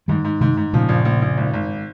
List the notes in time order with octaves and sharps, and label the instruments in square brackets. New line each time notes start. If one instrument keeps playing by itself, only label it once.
[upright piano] G#2 [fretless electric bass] D#3 G3
[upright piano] G#2
[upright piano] G#2 [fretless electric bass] C3 D#3
[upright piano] G#2
[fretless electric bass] A#2 C#3 [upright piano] F3
[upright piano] A#1
A#1
A#1
G#1
G#1